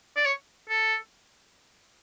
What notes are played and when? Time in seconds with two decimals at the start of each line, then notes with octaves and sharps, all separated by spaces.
0.16 D5
0.26 C#5
0.69 A4